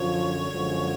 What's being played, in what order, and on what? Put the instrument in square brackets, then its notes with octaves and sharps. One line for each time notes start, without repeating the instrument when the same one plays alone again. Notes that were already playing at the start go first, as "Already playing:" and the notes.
Already playing: [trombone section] F#2 D3 F3 [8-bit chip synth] C#5
[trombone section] F#2 D3 F3 G#3